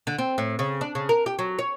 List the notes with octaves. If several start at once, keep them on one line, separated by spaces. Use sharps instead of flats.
D3
C4
A2
C#3
D4
C#3
A#4
G4
F#3
C#5